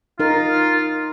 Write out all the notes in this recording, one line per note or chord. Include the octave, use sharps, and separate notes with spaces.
D#4 F4 A#4